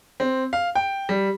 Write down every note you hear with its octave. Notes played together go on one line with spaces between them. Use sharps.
C4
F5
G5
G3